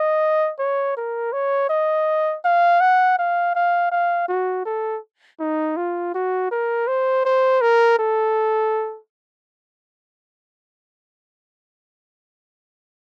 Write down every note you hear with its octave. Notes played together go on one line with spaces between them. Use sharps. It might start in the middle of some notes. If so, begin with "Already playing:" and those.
Already playing: D#5
C#5
A#4
C#5
D#5
F5
F#5
F5
F5
F5
F#4
A4
D#4
F4
F#4
A#4
C5
C5
A#4
A4